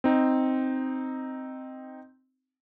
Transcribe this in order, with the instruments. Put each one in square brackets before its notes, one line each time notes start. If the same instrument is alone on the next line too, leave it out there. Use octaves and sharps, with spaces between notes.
[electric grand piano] C4 D#4